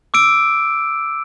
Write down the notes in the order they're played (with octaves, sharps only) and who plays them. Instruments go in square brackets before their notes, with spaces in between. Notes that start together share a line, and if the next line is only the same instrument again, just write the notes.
[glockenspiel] D6 E6 D7